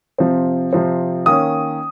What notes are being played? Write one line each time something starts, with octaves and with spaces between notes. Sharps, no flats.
C3 F3 C4
C3 F3 C4
D#3 A#3 C#4 D#6